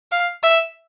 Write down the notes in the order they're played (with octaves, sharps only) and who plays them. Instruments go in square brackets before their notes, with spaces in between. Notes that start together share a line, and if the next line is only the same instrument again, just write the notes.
[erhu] F5
E5